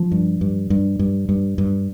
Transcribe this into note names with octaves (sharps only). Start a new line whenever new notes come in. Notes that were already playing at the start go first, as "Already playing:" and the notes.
Already playing: F3
G2
G2
G2
G2
G2
G2